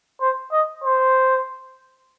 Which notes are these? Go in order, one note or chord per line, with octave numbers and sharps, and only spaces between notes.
C5
D#5
C5